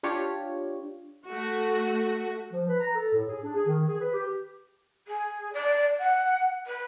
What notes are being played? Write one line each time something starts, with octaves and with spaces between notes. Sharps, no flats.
D4 F4 G4 C#5
A3 F#4
F3
B4
A#5
A4
A2
G#4
D4
G#4
D#3
G#4
B4
G4
G#4
D5
F#5
B4